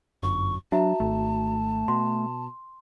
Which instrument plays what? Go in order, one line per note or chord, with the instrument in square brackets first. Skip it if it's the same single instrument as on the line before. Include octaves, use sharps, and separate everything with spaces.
[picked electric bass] G1 [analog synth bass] F#2 [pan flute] C#6
[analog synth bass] F#3 [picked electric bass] D4 [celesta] F#4 E5 A#5 [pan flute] A5
[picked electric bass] G#1 [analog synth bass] A3
[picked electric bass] B2 [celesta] C6